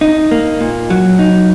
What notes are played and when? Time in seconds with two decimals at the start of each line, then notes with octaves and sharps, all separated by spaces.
0.01 D#4
0.31 A#3
0.61 A#2
0.90 F#3
1.19 D#4